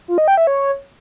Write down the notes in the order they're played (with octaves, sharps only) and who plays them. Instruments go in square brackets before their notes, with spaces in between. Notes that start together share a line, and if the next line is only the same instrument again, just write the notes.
[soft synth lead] F4
D#5
G5
E5
C#5